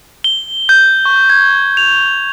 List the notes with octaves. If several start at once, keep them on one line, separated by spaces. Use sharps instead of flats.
G7
G6
C#6
G#6
F7